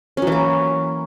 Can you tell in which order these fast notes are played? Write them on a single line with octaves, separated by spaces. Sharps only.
C#4 F#3 E3 A#3